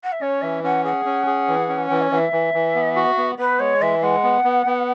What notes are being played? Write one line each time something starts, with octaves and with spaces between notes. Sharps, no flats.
F#5
E5
C#4 C#5
E3 E5
C#4 F#5
G#4 F#5
C#4
G#4
E3
C#4
E3
C#5
E3 E5 F#5
E3
E3
B3
F#4
B3
B3 B4
G#3 C#5
E3 E5
G#3 F#5
B3
B3
B3